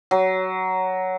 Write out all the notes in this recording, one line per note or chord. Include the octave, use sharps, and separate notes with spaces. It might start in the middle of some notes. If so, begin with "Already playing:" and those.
F#3